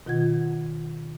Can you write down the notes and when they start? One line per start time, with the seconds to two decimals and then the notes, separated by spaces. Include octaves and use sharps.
0.06 B2 D#3 F4 F#5 G#6